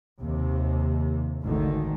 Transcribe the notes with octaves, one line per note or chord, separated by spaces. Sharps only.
D#2 C3
G#1 D2 D3 D#3